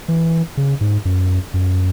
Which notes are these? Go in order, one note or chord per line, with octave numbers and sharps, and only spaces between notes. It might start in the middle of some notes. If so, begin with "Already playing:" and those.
E3
C#3
G#2
F#2
F#2